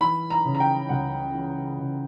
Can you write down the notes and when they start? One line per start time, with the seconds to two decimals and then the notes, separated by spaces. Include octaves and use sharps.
0.01 E3 B5
0.30 A#5
0.45 C#3
0.55 A#5
0.60 G5
0.89 C#2 F#5
1.34 E3
1.79 C#3